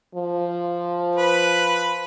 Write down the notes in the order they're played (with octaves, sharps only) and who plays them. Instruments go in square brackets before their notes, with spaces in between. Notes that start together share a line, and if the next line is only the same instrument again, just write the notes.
[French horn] F3
[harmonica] B4